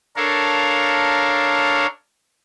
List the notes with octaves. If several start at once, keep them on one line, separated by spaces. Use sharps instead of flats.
D4 A4 A#4 C#5 F5